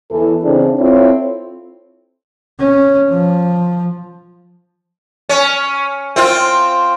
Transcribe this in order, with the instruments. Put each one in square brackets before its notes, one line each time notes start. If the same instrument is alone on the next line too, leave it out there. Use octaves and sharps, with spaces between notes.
[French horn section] E2 E3 A4
C#3 E3 C4 D4 D#4 G#4
C4 E4 F4 A4 C#5
[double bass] C#4
F3
[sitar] C#4
C4 F4